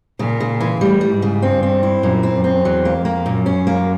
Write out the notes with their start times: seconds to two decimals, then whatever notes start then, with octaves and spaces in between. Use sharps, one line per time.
0.19 A#2 C#3
0.40 C#3
0.60 E3
0.81 A2 G3
1.01 G3
1.11 G#2
1.22 C#3
1.42 G2 C4
1.63 C4
1.83 E4
2.03 F#2 A#2
2.23 C4
2.35 F#2
2.44 C4
2.64 E2 F#3
2.85 A#3
2.95 F2
3.05 A#3
3.26 F#2 A#2
3.46 C#4
3.67 A#3